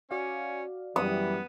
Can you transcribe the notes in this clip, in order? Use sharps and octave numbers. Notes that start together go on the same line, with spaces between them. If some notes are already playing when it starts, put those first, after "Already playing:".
C#4 F#4 D5 F5
F#2 E3 G3 B3 D#6